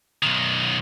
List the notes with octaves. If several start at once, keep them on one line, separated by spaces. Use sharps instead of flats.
B1 D#3